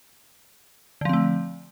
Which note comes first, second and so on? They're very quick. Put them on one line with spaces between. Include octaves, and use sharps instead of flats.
D3 F3 C4 A3